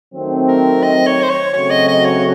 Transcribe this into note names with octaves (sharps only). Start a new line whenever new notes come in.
D#3 F#3 A3 C4
A#4
D#5
C#5
C5
C#5
C#3 F#3 A3 C4 F#4 C#5
D#5
D#5
C#5